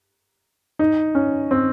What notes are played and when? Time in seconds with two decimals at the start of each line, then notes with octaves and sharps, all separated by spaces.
0.79 D#4
1.15 C#4
1.51 C4